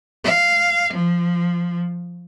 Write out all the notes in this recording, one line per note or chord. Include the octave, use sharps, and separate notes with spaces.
F5
F3